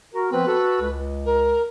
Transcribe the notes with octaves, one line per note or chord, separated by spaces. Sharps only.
F#4 A#4
F3 B3 C4 B4
F#4 A4
C#2
A#4